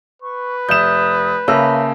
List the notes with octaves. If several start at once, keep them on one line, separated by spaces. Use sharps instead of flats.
B4 C#6
F1 E5 D#6 G6 E7
C#3 A#3 C#5 E5 A5 B5 E6